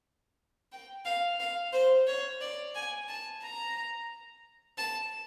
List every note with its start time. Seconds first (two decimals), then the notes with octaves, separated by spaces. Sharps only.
0.72 G5
1.05 F5
1.40 F5
1.73 C5
2.07 C#5
2.41 D5
2.75 G#5
3.08 A5
3.42 A#5
4.78 A5